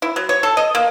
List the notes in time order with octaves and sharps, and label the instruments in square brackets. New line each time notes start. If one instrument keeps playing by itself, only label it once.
[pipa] E4
F#3
C#5
A4
D#5
A#3